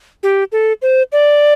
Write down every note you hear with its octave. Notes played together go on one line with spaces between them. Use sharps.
G4
A4
C5
D5